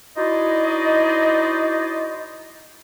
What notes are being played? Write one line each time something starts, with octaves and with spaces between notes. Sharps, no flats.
D#4 E4 F#4 C5 D5 D#5